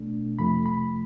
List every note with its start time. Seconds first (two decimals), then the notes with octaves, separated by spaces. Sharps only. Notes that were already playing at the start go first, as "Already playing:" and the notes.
Already playing: B2 A3 D4
0.38 F2 C3 F3 A3 B5
0.66 B5